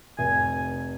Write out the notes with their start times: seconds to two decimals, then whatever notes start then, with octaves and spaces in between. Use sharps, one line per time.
0.18 F1 G#5